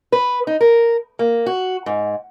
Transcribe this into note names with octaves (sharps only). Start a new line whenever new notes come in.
B4
D#4
A#4
A#3
F#4
G#2